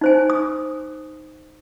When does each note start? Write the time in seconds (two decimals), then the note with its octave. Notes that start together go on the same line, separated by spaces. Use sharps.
0.01 D#4 C5 G#5
0.30 D#6